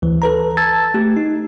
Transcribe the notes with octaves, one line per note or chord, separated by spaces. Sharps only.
D2 E3
A4 B4 A#5
A5 E6 G#6 A6
A3 G4
D#4